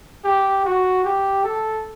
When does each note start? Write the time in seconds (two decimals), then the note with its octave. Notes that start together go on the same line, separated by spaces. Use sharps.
0.24 G4
0.65 F#4
1.04 G4
1.44 A4